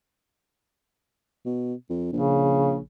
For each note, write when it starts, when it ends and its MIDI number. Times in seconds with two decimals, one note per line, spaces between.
1.45 1.74 47
1.90 2.12 41
2.13 2.79 34
2.13 2.78 49